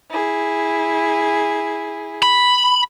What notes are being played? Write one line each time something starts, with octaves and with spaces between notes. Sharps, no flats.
E4 G#4
B5